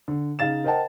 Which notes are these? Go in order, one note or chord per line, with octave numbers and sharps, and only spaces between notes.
D3
C#3 D#4 F5 A6 E7
A#4 C5 D#5 F#5 G5 A5